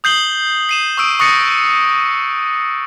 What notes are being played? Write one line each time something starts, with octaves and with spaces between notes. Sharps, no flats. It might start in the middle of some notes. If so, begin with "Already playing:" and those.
D#6 G6 C7 F#7 G7
C7 D#7 E7
C#6 D#6 E6 D7
C#6 D#6 F#6 A6 A#6 C#7